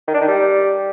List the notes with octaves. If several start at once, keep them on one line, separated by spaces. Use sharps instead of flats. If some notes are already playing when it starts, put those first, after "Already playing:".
D#3
D4
D#3
G3